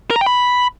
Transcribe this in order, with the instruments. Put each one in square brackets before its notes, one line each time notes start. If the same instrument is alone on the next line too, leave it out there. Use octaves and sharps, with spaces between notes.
[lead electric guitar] A#4
A#5
G5
B5